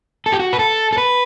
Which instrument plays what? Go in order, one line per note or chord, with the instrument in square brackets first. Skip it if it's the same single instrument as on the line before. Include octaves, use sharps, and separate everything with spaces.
[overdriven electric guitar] A4
G4
F#4
B4
A4
A4
B4